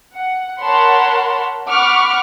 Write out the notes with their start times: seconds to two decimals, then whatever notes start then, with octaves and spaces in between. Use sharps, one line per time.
0.15 F#5
0.62 A#4 C#5 F#5 A5 B5 C6
1.69 F#5 B5 C#6 D6 F6